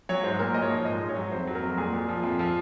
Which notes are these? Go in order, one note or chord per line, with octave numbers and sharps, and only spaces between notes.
F#3 C#5
G#2 C5
A#2 A#4
A#2 D#5
C#5
F3
G#2 D#5
G#2
C#5
F#3
F2 C5
F#3
A#4
F2
A#2 G#4
A#2
F3
F2
F3